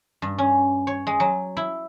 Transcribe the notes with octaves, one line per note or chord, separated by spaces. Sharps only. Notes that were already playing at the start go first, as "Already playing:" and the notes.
G2
C#4
C#5
G#3
F#3
E4